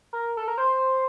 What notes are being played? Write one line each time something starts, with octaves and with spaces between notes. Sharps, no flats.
A#4
A4
A#4
C5